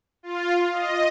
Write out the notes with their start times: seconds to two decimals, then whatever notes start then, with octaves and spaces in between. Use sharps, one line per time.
0.23 F4
0.72 D#5